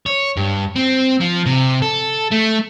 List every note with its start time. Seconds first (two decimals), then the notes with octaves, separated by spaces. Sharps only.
0.06 C#5
0.37 G2
0.76 C4
1.20 F3
1.46 C3
1.82 A4
2.32 A3